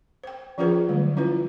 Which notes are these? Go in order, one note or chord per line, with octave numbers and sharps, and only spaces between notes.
C5 G5
F3 C#4 F4 G#4 B4 C5
D3 F#3 G3 A3
C#4 E4 F4 B4